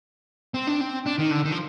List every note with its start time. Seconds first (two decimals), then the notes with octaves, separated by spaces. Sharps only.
0.54 C4
0.67 D4
0.81 C4
1.06 D4
1.19 D#3
1.31 D3
1.45 D#3
1.52 F3